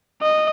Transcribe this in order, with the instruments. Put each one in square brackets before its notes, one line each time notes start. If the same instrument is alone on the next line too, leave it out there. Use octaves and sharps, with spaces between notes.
[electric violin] D#5